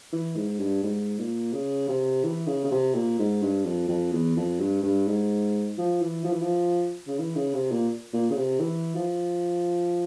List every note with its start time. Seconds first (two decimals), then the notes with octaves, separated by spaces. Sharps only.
0.12 E3
0.35 G#2
0.59 G2
0.83 G#2
1.19 A#2
1.53 C#3
1.88 C3
2.24 E3
2.47 C#3
2.64 C#3
2.71 C3
2.94 A#2
3.19 G#2
3.42 G2
3.65 F2
3.88 F2
4.12 E2
4.37 F2
4.60 G2
4.83 G2
5.07 G#2
5.78 F3
6.01 E3
6.25 F3
6.32 E3
6.42 F3
7.07 C#3
7.19 E3
7.36 C#3
7.54 C3
7.71 A#2
8.13 A#2
8.30 C#3
8.36 C3
8.59 E3
8.95 F3